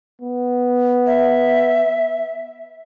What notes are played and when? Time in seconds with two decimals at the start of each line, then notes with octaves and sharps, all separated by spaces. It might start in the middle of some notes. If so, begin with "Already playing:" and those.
0.22 B3
1.07 E5